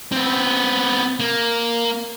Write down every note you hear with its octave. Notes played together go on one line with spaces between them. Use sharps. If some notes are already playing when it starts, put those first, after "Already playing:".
B3 C4
A#3